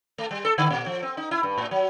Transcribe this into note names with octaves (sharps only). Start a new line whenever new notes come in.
A3
G3
A4
D3
A#2
F3
C4
D#4
E4
G2
A2
F#3